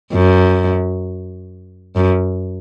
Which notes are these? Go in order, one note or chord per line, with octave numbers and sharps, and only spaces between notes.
F#2
F#2